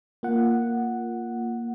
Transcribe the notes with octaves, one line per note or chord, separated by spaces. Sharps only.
A#3 F4 F#5